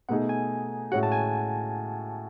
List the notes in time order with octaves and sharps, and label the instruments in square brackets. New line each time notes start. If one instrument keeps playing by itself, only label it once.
[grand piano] B2 A3 D#4 G#4 [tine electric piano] F#5
[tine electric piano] G#5
[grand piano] A2 G#3 C#4 F#4 [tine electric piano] F#5
[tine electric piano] A5
G#5